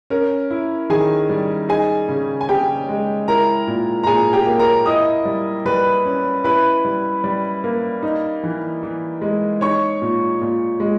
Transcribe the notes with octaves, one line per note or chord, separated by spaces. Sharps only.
C#4 A#4
E4
D#3 G#4 G#5
G3
D#4 G#4 G#5
C#3
G#5
C#3 G4 G5
G#3
E4 A#4 A#5
A#2
A#5
A#2 G#4 G#5
G4 G5
A#3
A#4 A#5
E4 D#5 D#6
G3
G3 B4 B5
C#4
E4 B4 B5
G3
G3
A#3
D#4
E3
E3
G#3
D#4 C#5 C#6
A#2
A#2
G#3